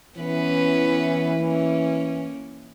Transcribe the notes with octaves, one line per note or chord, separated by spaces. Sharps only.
E3 B3 C#4 B4
A#3 C#4